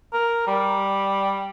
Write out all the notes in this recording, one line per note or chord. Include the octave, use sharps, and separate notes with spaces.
A#4
G3